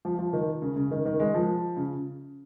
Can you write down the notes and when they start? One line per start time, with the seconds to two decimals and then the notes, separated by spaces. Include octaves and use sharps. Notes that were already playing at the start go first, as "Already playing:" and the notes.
0.05 F3
0.19 F3
0.33 D#3
0.62 C#3
0.76 C#3
0.91 D#3
1.05 D#3
1.19 G#3
1.34 F3
1.77 C#3